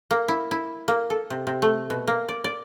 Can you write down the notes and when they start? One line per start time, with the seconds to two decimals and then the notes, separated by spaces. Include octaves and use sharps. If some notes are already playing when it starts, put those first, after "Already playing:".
0.11 A#3
0.28 E4
0.51 E4
0.88 A#3
1.10 A4
1.30 C3
1.47 C3
1.62 A3
1.90 B2
2.07 A#3
2.29 D5
2.44 D5